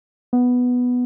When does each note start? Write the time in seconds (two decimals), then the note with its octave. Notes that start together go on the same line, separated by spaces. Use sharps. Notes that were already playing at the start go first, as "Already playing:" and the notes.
0.33 B3